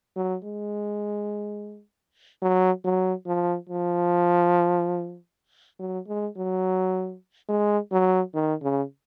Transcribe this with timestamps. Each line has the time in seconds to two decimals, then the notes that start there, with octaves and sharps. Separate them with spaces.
0.16 F#3
0.43 G#3
2.42 F#3
2.84 F#3
3.26 F3
3.69 F3
5.79 F#3
6.08 G#3
6.36 F#3
7.49 G#3
7.91 F#3
8.34 D#3
8.62 C#3